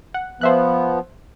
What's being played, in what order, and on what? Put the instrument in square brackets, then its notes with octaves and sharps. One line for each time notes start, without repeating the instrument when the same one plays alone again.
[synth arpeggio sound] F#5
[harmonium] F3 B3 [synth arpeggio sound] C5 E5 F#6